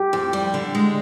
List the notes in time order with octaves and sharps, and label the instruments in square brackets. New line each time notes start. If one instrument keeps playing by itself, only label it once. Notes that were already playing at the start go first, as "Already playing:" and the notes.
Already playing: [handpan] G4
[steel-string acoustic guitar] F2
G3
D3
G#3